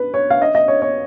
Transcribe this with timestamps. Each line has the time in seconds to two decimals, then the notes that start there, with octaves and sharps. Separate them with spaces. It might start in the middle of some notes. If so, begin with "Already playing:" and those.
Already playing: B4
0.14 C#5
0.30 F5
0.42 D#5
0.55 D#5
0.68 C#5
0.82 C#5